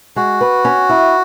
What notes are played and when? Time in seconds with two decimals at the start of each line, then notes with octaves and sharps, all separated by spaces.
0.16 G#3 F#4
0.41 B4
0.65 C#4
0.89 E4